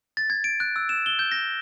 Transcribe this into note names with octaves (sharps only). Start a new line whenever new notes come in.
A6
G#6
D7
F#6
E6
E7
G7
G6
A#6